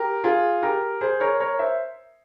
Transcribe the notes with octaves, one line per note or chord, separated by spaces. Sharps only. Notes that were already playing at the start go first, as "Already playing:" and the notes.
Already playing: G4 A#4
F4 G#4
G4 A#4
G#4 C5
A#4 C#5
A#4 C#5
C5 E5